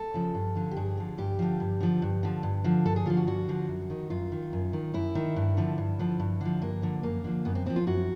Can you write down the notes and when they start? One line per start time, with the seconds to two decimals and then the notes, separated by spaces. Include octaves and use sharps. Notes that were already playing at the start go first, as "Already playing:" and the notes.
Already playing: A4
0.14 C#3 F3
0.35 G2
0.55 D3 F3
0.71 G4
0.76 G2 G#4
0.97 D3 F3
1.18 G2 G4
1.39 D3 F3
1.60 G2
1.80 D3 F3
2.02 G2
2.23 D3 F3
2.43 G2
2.64 D3 F3
2.85 G2 A4
2.96 G#4
3.06 D3 F3 F4
3.17 F#4
3.27 G2 F#4
3.48 D3 F3
3.69 F#2
3.90 D#3
4.10 F#2 F4
4.32 D#3
4.53 F#2
4.73 D#3
4.94 F#2 E4
5.15 D#3
5.36 G2
5.57 D3 F3
5.78 G2
5.99 D3 F3
6.20 G2
6.41 D3 F3
6.61 G2 A#3
6.82 D3 F3
7.03 F#2 A#3
7.24 D3 F3
7.45 F#2 B3
7.55 C4
7.66 D3 F3 C4
7.76 F4
7.87 F#2 F#4